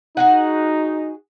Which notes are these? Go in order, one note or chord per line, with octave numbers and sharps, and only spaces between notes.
D#4 F#4 G#4 F#5